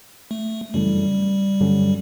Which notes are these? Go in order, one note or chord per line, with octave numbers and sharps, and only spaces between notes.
A3
F#2 C#3 E3 G3 A3
G2 D3 F#3 C#4